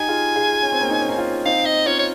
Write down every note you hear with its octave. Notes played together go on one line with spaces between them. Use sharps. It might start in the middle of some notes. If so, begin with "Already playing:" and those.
Already playing: D#4 G4 G#5
F4 G#4
F4 G#4
C#4
C4
A#3 C#4
D#4
C#4
C4 D#4
C#4 F4
C4 D#4 F5
D#5
C#4 F4 C#5
C#5